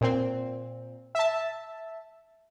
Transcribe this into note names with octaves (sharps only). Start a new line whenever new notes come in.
A#2 C4
E5 A5